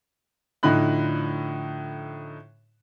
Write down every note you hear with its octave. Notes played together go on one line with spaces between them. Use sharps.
A2 D3 F3 D#4 B5 F#6